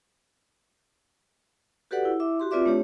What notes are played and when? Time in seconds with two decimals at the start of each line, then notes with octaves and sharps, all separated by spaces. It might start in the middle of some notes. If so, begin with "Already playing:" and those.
1.91 F#4 G4 A4 B4 D5 F#5
2.05 E4
2.20 E4 E5 D6
2.40 F#4 G4 C6
2.51 C4 F4 B4 D5 E5 D6
2.65 A3 D4 G4 C#5